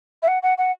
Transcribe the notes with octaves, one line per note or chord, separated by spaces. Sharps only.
E5
F#5
F#5
F#5